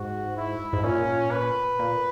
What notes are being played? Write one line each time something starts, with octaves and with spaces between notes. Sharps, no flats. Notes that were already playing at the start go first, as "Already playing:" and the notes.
Already playing: G#2 F#4
E4
G#2
A#2 C#4
B4
A#2